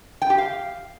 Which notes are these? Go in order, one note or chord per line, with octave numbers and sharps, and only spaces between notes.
G5
G4
F5